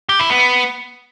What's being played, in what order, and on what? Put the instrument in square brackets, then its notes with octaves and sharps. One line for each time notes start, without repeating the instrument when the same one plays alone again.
[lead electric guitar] G4
E4
B3